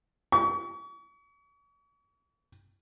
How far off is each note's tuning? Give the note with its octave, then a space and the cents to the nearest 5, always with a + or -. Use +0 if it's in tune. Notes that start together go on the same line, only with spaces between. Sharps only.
C#6 +40